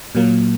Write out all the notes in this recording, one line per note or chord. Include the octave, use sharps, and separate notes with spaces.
A#2 F#3 A#3